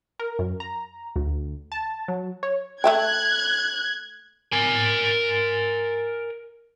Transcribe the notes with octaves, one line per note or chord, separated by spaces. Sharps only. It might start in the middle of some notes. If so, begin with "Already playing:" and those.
A#4
F#2
A#5
D2
A5
F#3
C#5
A3 E5 G5 F#6 G#6
A#4 G#5